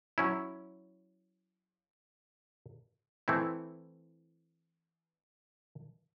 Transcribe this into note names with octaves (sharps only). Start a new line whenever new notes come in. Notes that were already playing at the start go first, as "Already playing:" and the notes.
F#3 C#4 E4
E3 A3 C4 E4